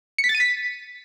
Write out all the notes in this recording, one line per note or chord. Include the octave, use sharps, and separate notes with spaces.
C#7
B6
A6
D#7
B6